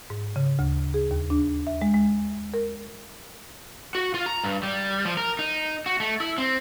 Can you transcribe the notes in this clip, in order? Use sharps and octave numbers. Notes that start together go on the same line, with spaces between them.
G#2
C#3
D2
G#4
D#2
D4
E5
G#3
G#3
A#4
F#4
F4
A#5
G2
G3
F3
A#4
D#4
F#4
A3
E4
C4